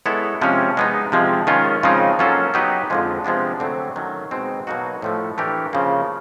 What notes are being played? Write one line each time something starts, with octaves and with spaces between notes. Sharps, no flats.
G#3 B3 E4 A4 C#5
C3 F3 G#3 C#4
G#3 B3 D#4
C3 F3 G#3
D#3 G#3 C#4 F4
C#3 F3 G#3 C4 D#4
F#3 A#3 C#4 F4 A4
F#3 B3 D#4 G4 B4
F2 D3 F3 G#3
C3 F3 G#3 B3 D4
D3 F#3 A3 C4
D#3 F#3 A3 C#4
B2 G#3 C4 D#4
B2 F#3 A#3 D#4 F#4
A2 F3 A3
E3 A3 D4 G4 A#4
C#3 F3 A#3